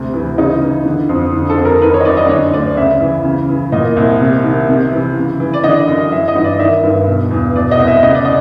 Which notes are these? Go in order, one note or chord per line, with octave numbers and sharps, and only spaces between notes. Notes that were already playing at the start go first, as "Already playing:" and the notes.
Already playing: D2 C3
E3
C#3 D#4
E3
D3
F2
D3
A4
F2
A#4
D#3 B4
C#5
D#5
F#2 D5
D#5
D3 C#5
D2 D5
C#3 E5
E3
C#3
E3
A#2 D#5
C2
C3
D#3
C3
E3
C#3
E3
D5
D3 D#5
F#2
E3 E5
D#5
G2
D5
D#3 E5
G2
B2
E2
B2 D5
D#5
C2
E5
C#3 D#5
D5
D#5